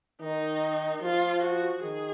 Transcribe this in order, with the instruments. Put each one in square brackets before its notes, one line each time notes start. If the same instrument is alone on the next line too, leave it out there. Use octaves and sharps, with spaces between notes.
[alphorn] D#3 [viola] D#4
[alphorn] F3 [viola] F4
[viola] F#4
[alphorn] D#3 [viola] G#4